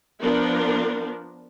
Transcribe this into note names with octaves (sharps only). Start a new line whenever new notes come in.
F3 B3 D4 A#4